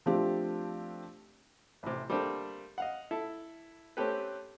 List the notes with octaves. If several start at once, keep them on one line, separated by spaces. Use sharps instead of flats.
F3 A3 C4 D4 G4
A1 C3
G3 A3 A#3 C4 D4
D#5 F5 F#5
E4 A4
A3 C4 C#4 G4 A4 B4